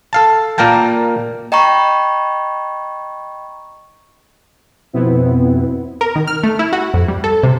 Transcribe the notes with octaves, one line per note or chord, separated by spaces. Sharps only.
A4 F5 A5
A#2 A#3 A#4 G5 A5
D#5 G5 A#5 B5 C#6
F2 B2 B3 C4 E4
A#4
D#3
F6
A3
E4
F#4
F2
G3
A4
C3